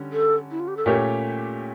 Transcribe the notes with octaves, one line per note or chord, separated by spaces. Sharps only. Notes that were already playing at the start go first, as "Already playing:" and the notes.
Already playing: D3 G3 C#4
A4
E4
F4
G4
A4
A#2 A3 C#4 G4 A#4 C#5